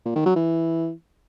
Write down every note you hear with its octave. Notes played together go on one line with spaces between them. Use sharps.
A#2
D#3
F#3
E3